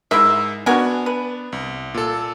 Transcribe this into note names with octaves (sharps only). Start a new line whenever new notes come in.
G#2 E4 G#4 A#4 E5
B3 D4 F#4 A#4 G#5
B4
C2
A#2 A4